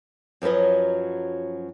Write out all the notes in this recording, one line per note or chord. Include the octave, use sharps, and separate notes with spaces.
F#2 F3 F#3 B4 D#5